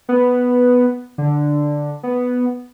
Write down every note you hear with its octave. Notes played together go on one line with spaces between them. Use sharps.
B3
D3
B3